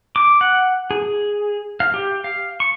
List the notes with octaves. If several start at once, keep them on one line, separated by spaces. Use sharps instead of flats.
D6
F#5
G#4
F5
G4
F5
C#6